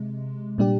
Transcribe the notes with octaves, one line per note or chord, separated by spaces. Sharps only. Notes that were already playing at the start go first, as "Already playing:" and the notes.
Already playing: C3 G#3
A#2 G3 D4 G4